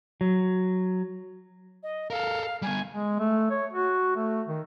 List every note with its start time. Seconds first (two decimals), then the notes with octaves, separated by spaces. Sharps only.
0.21 F#3
1.83 D#5
2.10 A4 A#4 F5
2.63 G3 B3 G#5
2.91 G#3
3.19 A3
3.51 C#5
3.73 F#4
4.16 A3
4.48 D#3